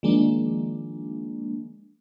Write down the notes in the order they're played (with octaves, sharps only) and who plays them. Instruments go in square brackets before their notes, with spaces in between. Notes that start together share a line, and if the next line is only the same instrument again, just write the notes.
[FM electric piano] D#3 F3 G#3 A#3 D4